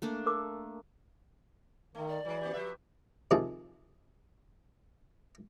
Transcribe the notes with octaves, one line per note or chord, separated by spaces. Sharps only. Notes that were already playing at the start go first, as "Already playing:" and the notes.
A3 A#3 D4
A#4 D6
D#3 A3
D5
E3 F#3 G#3
A#3 F#4 G4
F3 G4 B4 E5
C3 D#3 F3 G#4 A5